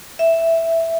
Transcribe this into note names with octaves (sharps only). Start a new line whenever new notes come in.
E5